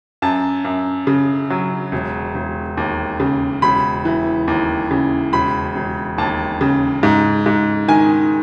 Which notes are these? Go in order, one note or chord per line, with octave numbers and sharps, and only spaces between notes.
F#2 A5
F#2
C#3
F#3
E1
E1
D#2
C#3
E1 B5
E3
D#2
C#3
E1 B5
E1
D#2 A5
C#3
G#2
G#2
D#3 G#5